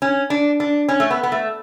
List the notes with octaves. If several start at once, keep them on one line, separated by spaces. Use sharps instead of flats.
C#4
D4
D4
C#4
A3
B3
B3
A3